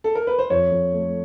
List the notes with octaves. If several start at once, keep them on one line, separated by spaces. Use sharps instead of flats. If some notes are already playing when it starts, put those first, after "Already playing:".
A4
A#4
B4
C5
F2 C#5
F2
A3